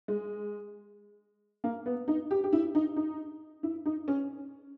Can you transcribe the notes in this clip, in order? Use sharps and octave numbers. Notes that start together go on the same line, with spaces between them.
G#3
A#3
B3
D#4
G4
G4
E4
D#4
D#4
E4
D#4
C#4